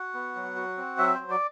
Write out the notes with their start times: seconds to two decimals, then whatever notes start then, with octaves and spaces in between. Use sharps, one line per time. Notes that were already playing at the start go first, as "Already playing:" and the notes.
Already playing: F#4 F#5
0.14 B3
0.35 F#3
0.56 F#4
0.77 C4
0.98 F#3 E5
1.14 F#3 C5
1.30 D5